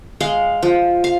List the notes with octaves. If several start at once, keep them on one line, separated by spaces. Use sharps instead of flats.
G#3 F5
F3
F5